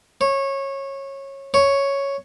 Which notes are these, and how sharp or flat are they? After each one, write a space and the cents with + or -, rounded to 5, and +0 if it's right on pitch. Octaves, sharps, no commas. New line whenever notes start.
C#5 -20
C#5 +0